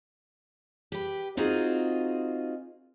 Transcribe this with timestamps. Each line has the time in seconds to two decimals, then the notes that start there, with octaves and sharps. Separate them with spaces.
0.92 G4 B4
1.37 C4 D#4 F4 F#4 G#4 A#4